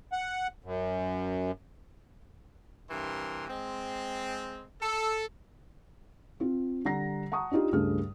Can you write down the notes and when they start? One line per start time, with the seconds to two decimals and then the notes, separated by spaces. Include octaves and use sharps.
0.12 F#5
0.65 F#2
2.90 G2 C3 E3 A#4 C6
3.48 G#3 C4
4.81 A4
6.40 C4 F4
6.85 D3 G3 F#5 A#5 A#6 C7
7.32 F#5 A5 A#5 C#6 D#6
7.51 D4 D#4 F4 G4
7.73 C#2 G2 G3 A3 G#4 F6